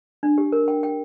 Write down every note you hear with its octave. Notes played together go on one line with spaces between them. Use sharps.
D4
G4
A#4
G5
G5